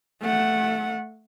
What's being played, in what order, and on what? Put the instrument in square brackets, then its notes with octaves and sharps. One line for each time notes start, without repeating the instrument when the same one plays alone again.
[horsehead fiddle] A3 F#5